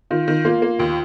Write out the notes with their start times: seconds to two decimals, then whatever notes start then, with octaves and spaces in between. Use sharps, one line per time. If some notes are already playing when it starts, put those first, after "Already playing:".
0.10 D#3 F4
0.28 D#3
0.45 A#3 F4
0.62 A#3
0.79 D#2 F4